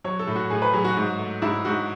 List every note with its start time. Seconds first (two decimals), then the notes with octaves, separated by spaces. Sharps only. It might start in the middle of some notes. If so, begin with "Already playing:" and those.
0.04 F#3 C#5
0.19 A4
0.27 A2
0.35 F#4
0.50 A2 G#4
0.62 B4
0.73 F#3 G#4
0.84 F#4
0.97 G#2
1.19 A3
1.42 G#2 E4
1.65 G#2 F#4